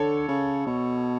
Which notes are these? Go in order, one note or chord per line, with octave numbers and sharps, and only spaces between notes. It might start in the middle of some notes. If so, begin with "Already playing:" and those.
Already playing: D3 A4 C#5
C#3
B2